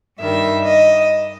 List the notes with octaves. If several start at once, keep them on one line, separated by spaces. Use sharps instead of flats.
G2 D#3 G3 E5
D#5